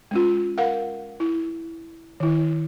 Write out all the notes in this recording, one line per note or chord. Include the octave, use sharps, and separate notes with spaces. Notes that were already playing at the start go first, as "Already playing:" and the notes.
G#3 C#4 F4
A#4 F5 F#5
E4
D#3 E4